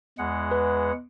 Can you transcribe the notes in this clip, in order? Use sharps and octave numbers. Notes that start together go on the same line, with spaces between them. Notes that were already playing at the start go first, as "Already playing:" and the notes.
E2 G#3 F#5
B4